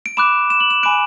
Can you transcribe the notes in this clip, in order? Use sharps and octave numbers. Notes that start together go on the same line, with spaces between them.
D7
B5 D6 F#6 E7
E7
F#7
E7
G#5 B5 D6 F#6 D7